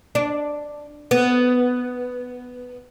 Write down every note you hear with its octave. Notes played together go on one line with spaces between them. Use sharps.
D4
B3